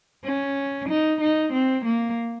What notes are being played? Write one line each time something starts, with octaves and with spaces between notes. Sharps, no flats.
C#4
D#4
D#4
C4
A#3